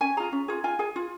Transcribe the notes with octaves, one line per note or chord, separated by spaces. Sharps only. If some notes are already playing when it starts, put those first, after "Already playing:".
C#4 G#5
F4 G#4 A#5
C#4
F4 G#4
F4 G#5
G#4 G#5
F4